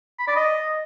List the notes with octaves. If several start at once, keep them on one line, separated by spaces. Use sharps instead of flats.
B5
D5
D#5